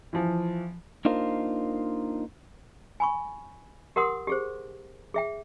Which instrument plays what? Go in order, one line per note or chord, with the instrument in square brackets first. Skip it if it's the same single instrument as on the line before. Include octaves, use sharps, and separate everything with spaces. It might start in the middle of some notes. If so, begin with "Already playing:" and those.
[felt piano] E3 F3
[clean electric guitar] A#3 D4 D#4 F4 A#4 C5
[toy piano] G#5 B5 C#6
G4 A#4 F#5 C6 D#6
G4 G#4 C5
G#4 E5 G5